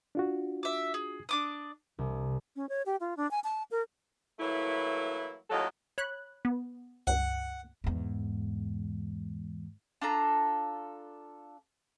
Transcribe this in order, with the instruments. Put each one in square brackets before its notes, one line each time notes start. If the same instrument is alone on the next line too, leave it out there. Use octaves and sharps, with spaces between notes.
[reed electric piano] D4 F4 F#4
[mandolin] E5 D6
G#4
D4 D6 D#6
[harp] C2
[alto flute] C#4
C#5
G4
F4
D4
G#5
A5
A#4
[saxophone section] E3 F#3 A3 A#3 E4
D#2 A2 F#3 F4 A4 D#5
[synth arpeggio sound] C#5 B5 F#6
B3
[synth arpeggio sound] C#2 G2 [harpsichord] F#5
[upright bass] E2 G#2
[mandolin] D4 F4 A4 A#5